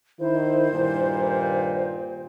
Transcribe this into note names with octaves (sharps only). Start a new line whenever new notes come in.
D#3 E4 C5
G2 A#2 D#3